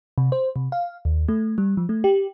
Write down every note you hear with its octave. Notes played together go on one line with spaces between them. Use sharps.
C3
C5
C3
F5
D#2
A3
G3
F3
A3
G4